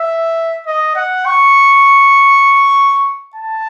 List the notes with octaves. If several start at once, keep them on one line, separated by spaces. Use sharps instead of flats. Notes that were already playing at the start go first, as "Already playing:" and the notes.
Already playing: E5
D#5
F#5
C#6
A5